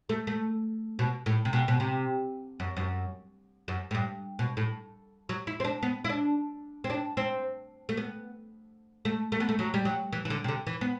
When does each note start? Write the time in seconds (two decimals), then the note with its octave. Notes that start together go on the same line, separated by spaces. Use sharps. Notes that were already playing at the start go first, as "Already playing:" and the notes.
0.09 A3
0.27 A3
0.99 B2
1.26 A2
1.45 C3
1.53 B2
1.68 B2
1.80 C3
2.60 F#2
2.77 F#2
3.68 F#2
3.91 A2
3.95 G2
4.39 B2
4.57 A2
5.29 F#3
5.47 E4
5.60 C4
5.65 D4
5.83 B3
6.05 E4
6.09 D4
6.84 C4
6.90 D4
7.17 C4
7.89 A3
7.97 B3
9.05 A3
9.32 A3
9.40 B3
9.49 A3
9.59 F#3
9.74 G3
9.85 F#3
10.13 E3
10.25 E3
10.30 D3
10.44 C3
10.48 D3
10.67 E3
10.81 B3